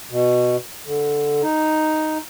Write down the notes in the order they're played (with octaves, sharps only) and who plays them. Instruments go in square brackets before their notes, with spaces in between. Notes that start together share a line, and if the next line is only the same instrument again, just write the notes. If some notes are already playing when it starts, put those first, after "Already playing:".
[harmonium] B2
D3
D#4